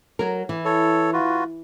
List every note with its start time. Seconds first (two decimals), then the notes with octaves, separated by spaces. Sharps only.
0.19 F#3 A#4
0.49 E3
0.65 A4 C#5
1.13 F4 F#4 B4